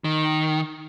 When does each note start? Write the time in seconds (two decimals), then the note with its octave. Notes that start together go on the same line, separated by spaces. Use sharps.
0.04 D#3